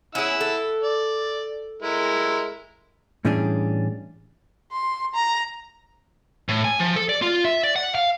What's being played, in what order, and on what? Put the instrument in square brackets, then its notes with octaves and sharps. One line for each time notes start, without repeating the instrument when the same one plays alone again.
[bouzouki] C#4 G#4 [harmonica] E4 F#5 E6
[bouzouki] A4
[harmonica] D5
G#3 E4 A#4
[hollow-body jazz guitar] A2 E3 G3 C#4 D4 G#4
[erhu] C6
A#5
[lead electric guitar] A2
G#5
F3
A4
D5
F4
E5
D5
F#5
F5